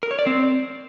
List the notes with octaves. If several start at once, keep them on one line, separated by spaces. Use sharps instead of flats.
A#4
C#5
D5
C4